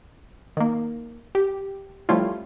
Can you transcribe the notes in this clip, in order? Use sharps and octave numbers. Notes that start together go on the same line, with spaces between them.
D#3 A#3
G4
F3 G3 A3 C#4 E4 F4